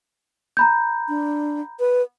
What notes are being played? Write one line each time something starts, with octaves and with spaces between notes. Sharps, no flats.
A#5 B5 G6
D4
B4